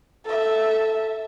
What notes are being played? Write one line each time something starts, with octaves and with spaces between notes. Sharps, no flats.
A4 E5